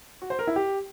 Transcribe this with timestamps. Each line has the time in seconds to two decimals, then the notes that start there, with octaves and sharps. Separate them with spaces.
0.22 F#4
0.30 C5
0.39 A#4
0.47 E4
0.56 G4